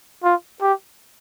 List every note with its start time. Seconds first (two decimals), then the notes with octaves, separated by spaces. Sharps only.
0.24 F4
0.61 G4